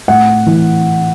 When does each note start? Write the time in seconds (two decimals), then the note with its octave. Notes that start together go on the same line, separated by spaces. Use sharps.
0.08 A2 F#5
0.46 E3